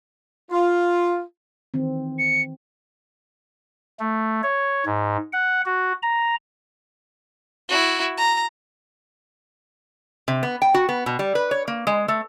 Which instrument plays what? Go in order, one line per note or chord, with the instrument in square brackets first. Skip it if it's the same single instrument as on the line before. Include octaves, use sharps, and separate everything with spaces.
[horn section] F4
[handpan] D#3 E3 C4
[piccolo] C#7
[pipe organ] A3
C#5
G#2
F#5
F#4
A#5
[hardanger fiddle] E4 F#4
A#5
[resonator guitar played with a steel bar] C3
B3
G5
F#4
B3
B2
G3
B4
C#5
A#3
G#3
A3